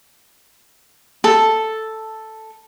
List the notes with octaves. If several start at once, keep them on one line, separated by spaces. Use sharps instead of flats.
A4